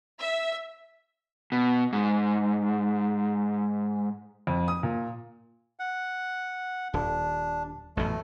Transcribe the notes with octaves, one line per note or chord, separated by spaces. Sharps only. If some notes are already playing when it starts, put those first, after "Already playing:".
E5
B2
G#2
F2
D#6
A#2
F#5
D#1 D4
A1 F#2 B2 A3